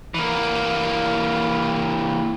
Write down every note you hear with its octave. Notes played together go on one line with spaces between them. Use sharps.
E3 A#3